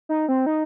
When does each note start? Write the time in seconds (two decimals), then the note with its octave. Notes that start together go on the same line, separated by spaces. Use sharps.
0.09 D#4
0.29 C4
0.46 D#4